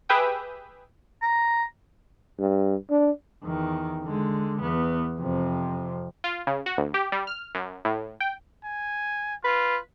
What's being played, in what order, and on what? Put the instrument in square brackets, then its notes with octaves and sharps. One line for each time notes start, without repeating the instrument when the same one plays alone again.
[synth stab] G4 G#4 B4 E5 G5 D#6
[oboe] A#5
[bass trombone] G2
D4
[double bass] E2 D#3
D3 G#3
E2 B3
F2 C3
[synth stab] F4
C#3
F#4
D2
G4
G3
F6
F#2
A2
G5
[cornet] G#5
[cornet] F4 [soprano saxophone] B4